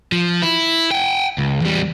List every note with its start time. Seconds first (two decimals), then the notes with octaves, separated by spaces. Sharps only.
0.12 F3
0.42 E4
0.92 F#5 G5
1.38 C#2
1.62 E2 G3